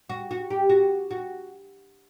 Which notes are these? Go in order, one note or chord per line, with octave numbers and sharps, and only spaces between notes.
F#4
F#4
G4
F#4
F#4